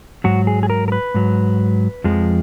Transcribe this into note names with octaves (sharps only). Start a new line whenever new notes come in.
G#2 F#3 F#4
G#4
G#4
A#4
A#4
B4
G#2 F#3
F2 F3 G#3